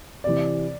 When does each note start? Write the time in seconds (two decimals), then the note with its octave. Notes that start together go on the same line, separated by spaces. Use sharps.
0.24 C3 E3 D5